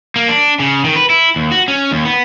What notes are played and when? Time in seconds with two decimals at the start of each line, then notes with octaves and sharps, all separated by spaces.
0.16 A#3
0.28 D4
0.60 C#3
0.85 D#3
0.96 B4
1.10 E4
1.36 D#2
1.52 F#4
1.68 C#4
1.91 D#2
2.05 B3